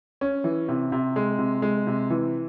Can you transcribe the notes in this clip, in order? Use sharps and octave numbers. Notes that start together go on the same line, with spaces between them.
C#4
E3
C3
C3
G#3
C3
G#3
C3
E3